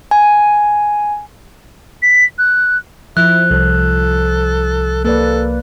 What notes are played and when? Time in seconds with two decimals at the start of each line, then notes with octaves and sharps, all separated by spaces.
0.11 G#5
2.02 B6
2.38 F#6
3.17 F3 E4 F#6
3.51 C2 A4
5.05 A#3 A4 B4 D5